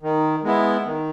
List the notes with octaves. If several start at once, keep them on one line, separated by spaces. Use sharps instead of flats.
D#3
G#3 B3 E4
D#3